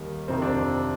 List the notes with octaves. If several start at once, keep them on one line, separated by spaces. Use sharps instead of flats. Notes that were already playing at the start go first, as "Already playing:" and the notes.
Already playing: D#2 D#3 G3
F2 C3 D#3 C4
D4
C4